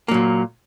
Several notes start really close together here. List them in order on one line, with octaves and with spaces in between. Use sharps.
A#3 F#3 A#2